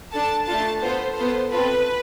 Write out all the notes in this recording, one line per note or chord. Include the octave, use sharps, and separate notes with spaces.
D4 A4 A5
A3 D4 F4 A4 A5
B3 F4 A4 C5
B3 F4 A4 C5
C4 F4 A4 B4